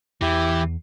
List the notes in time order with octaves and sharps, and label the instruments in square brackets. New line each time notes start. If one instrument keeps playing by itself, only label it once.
[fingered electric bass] E2 [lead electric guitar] E3 [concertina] E4 G4